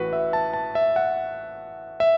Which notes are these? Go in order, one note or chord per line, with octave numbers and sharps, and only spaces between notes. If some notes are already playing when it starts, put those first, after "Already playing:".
Already playing: A1 A2 E3 F#4 B4
E5
A5
A5
E5
F#5
E5